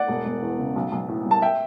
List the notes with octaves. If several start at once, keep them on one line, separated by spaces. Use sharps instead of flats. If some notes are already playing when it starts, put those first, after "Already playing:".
Already playing: D5 F#5
E1
E1
E2
C#3
B1
B1
A2
G3
A5
E5 G5